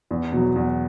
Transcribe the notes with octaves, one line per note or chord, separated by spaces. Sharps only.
E2
B2 F#3
E2